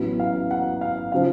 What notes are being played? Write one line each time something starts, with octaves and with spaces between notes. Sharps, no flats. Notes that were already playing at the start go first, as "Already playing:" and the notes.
Already playing: A1 A2 F#3 B3
F5
F#5
F5
C#3 F3 F5